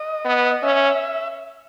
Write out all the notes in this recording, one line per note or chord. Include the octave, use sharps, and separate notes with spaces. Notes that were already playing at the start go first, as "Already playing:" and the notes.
Already playing: D#5
B3
C#4 E5